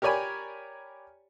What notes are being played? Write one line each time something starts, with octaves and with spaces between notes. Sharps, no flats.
G4 A#4 C#5 D5 G#5 B5